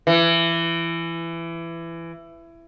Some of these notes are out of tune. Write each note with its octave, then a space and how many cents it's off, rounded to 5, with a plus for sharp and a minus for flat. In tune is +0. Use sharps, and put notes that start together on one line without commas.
E3 +20